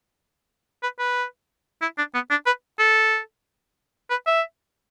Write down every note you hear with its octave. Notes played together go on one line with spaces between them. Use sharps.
B4
B4
E4
D4
B3
D4
B4
A4
B4
E5